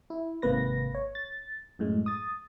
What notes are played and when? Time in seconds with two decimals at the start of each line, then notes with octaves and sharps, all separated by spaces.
0.10 E4
0.42 G#1 G#2 C3 A#3 B4 A#6
0.95 C#5
1.15 A6
1.79 F#2 A2 G#3
2.06 D#6 A6